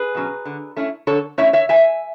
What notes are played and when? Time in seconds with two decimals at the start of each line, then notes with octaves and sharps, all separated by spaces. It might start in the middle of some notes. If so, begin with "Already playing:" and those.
Already playing: G#4 B4
0.15 B2 F#3 C#4
0.45 D3
0.77 A3 C#4 E4
1.07 D3 A4 C#5
1.38 A3 C#4 E4 C#5 E5
1.53 C#5 E5
1.69 A2 E5 G#5